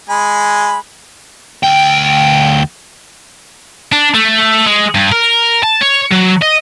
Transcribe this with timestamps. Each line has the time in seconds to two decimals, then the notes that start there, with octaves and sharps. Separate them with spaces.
0.09 G#3 G#5 B5
1.63 D2 G5
3.92 D4
4.14 A3
4.66 G#3
4.95 G2
5.12 A#4
5.63 A5
5.81 C#5
6.12 F#3
6.42 D#5